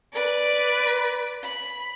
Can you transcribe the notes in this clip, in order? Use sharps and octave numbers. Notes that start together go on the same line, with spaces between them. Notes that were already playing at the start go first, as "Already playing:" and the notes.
B4 D5
B5